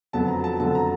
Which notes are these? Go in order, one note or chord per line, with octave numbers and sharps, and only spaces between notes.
F2 D3 F#3 B3 A5
A#5
A5
F2 D3 F#3 B3 A5
A#5